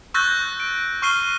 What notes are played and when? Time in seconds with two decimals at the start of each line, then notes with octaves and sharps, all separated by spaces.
0.14 C#6 E6 F#6 G6 A6 A#6
0.60 D7
1.02 C#6 F6 C7 D#7 G7